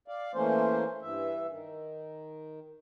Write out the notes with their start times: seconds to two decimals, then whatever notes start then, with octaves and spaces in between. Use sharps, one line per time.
0.08 D5 F5
0.35 E3 A3 A#3 C#4 C5
1.02 G2 E3 E5
1.50 D#3